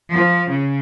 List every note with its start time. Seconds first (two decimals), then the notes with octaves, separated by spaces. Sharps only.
0.11 F3
0.49 C#3